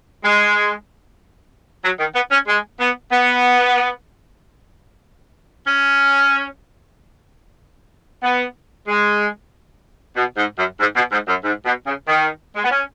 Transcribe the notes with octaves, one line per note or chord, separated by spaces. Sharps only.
G#3
F#3
D#3
B3
C#4
G#3
B3
B3
C#4
B3
G#3
B2
G#2
F#2
G#2
B2
G#2
F#2
G#2
B2
C#3
D#3
G#3
B3
C#4